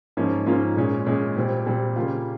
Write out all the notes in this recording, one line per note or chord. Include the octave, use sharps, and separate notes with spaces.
G#2 F3 A#3 C#4 F4
G#2 F3 A#3 C#4 F4
A#2 G#3 C#4
A#2 G#3 C#4
A#2 G3 C4
A#2 G3 C4
C#3 G3 A#3 F4